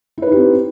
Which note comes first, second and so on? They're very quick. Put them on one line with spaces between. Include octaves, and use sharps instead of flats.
E4 B4 D#4 G4 C4